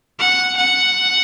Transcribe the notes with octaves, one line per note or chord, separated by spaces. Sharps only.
F#5
F#5